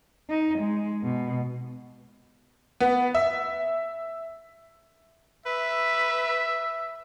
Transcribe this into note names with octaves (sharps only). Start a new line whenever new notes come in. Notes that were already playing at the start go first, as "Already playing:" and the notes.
D#4
G#3
B2
B3
E5
B4 E5